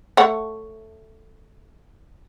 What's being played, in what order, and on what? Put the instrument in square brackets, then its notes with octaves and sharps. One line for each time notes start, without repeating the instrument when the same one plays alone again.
[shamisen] A3 C#5 F#5